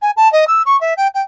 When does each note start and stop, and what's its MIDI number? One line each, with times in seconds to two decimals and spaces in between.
0.02 0.11 80
0.16 0.31 81
0.32 0.45 75
0.47 0.62 88
0.66 0.79 85
0.80 0.94 76
0.97 1.07 79
1.14 1.21 79